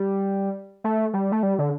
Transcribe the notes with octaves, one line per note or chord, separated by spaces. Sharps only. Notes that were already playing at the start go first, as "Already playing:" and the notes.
Already playing: G3
A3
G3
A3
G3
D3